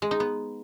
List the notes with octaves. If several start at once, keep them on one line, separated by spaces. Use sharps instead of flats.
G#3
D#4
B3